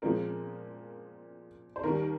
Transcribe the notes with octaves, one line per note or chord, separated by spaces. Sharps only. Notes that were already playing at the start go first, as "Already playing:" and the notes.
A#2 F3 G#3 C4 A#4
C5
D#2 D#3 G3 A#4